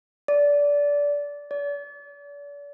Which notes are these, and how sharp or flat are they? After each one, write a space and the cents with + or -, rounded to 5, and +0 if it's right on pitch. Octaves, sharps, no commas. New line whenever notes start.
D5 -20
D5 -40